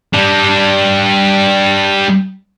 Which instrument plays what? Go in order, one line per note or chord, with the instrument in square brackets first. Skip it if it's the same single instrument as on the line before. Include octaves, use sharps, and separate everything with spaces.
[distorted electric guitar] G3 D4